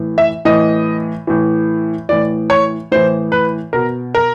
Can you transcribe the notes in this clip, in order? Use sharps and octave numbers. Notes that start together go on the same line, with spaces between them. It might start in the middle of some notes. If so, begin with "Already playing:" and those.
Already playing: A2 E3
E5
A2 E3 D#5
A2 E3
A2 E3 D5
C#5
A2 E3 C5
B4
B2 A#4
A#4